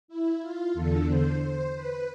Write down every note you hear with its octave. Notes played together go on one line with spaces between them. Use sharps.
E4
F4
E2 D3 A4
C5
C5
B4